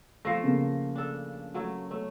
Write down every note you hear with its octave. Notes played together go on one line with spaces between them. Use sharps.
F3 A3 A#6 C7
C#3 A#3
D4 A4
F#3 A3 C#5
A3 C#5